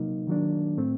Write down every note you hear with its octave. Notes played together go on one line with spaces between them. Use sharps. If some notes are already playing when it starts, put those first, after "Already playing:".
Already playing: C3 F#3 A#3 D#4
D#3 F#3 A#3 D4
A2 A3 C4